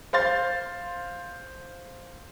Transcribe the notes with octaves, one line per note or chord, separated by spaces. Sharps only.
C5 F5 C6 A6